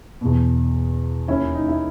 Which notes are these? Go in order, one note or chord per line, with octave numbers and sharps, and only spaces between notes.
E2 B2
D#2 D#3 C#4 E4
D#4
E4